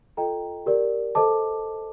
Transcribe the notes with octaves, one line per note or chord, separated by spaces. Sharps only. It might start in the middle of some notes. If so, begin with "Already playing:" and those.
F4 A4 D#5 G5 A#5
G4 A#4 D5
A4 C5 D#5 A5 D6